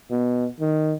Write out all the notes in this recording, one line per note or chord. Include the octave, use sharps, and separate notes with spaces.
B2
D#3